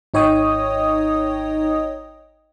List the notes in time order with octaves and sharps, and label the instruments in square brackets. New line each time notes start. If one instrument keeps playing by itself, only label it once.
[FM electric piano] G#1 D#4 C#5 D#5 G5 D#6